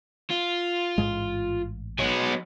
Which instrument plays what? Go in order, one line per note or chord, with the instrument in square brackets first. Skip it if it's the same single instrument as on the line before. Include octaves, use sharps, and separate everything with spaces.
[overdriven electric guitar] F4
[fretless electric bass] A1 G#2 G#3
[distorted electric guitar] F#3 B3 [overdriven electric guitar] D#5 G#5